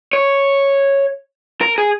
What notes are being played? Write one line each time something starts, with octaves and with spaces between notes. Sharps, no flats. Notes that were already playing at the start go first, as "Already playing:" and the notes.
C#5
A#4
G#4